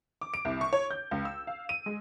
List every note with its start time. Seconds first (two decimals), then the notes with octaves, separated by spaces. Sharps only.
0.21 D6
0.34 D7
0.45 C2
0.61 C#6
0.73 C#5
0.91 G6
1.11 C#2
1.25 E6
1.47 F5
1.69 D#7
1.86 G#3